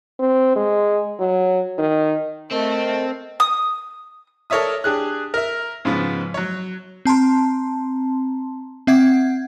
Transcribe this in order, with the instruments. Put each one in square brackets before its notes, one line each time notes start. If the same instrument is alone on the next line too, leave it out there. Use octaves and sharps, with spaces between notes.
[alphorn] C4
G#3
F#3
D#3
[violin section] A3 A4 [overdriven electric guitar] C4 [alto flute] A#4 [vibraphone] D#5
[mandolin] D#6
[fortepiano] A4 A#4 C#5 D5 E5 D#6
D4 G4 G#4 F#6
A#4 E5
G#2 C#3 F3 B3
F#3 C#5
[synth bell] C4 A5 A#5 C6
C4 E5 F#5 G#6